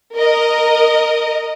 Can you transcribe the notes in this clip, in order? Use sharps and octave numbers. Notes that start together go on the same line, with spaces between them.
A#4 D#5